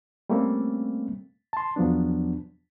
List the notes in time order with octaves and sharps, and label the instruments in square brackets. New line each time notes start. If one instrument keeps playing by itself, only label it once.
[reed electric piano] G3 A3 A#3 C4 C#4
A5 C6
E2 F3 F#3 B3 D4